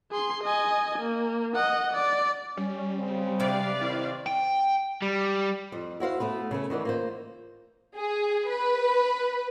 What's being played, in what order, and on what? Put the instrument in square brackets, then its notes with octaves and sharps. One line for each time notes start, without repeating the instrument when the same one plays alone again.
[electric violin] G#4 C6
D#5 G#5
A#3
D#5 F#5
D5
[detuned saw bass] G3 [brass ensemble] C#4
[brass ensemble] C#3 C4
[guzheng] C3 G5 [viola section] B4 D5 F5
[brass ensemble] D#3 C4 [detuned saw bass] E4
[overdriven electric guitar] G5
G3
[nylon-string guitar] F2
E4 F#4 C5 F5
A3 B3 B4
C#3 A3 B3
D#3 E3 B3 D5
A#3 F4 C5
[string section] G#4
B4